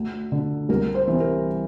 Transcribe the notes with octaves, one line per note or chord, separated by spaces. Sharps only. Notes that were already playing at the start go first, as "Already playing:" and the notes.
Already playing: D2
D3
C2 A#4
C5
C3 E3
A#4